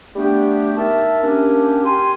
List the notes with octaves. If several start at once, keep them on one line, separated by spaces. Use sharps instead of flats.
G3 A3 B3 D4 G4
D#3 A#4 E5 A5
A#3 C#4 D4 G4
G4 G#5 C6